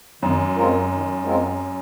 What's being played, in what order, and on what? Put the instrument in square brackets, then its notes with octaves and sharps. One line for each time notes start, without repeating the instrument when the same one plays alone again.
[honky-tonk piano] F#2 [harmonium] D#3
[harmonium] G#3 C4 F4 A#4
D#3
G#3 C4 F4 A#4